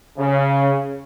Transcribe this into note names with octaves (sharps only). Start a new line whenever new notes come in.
C#3